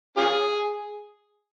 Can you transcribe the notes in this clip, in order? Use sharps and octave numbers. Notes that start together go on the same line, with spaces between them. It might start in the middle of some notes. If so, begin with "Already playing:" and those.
C#4 F4 G#4